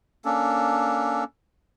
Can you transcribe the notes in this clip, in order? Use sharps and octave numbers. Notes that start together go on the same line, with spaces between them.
A#3 C#4 D4 A4